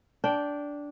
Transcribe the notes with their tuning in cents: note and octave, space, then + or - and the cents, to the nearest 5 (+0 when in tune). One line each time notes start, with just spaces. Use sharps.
D4 -10 G5 +0